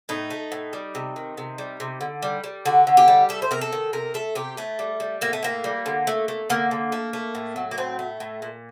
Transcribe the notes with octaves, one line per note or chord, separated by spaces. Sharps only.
A2 D#4
A3
A2
G3
C3
D#3
C3
G3
C3
D3
G3
G3
D3 F#4
D3
G4
G3
A3 A4
C5
C3 A#4
A4
D#3
C3 A#4
A3 A4
C3 G4
A2 A3
G3
G3
A2 A#3
A3
A2 A#3
G3
D3
A3
A3
D3 A#3
D3
A3
A3
A2
F#3
A#3
A2 C4
A3
A2
A#2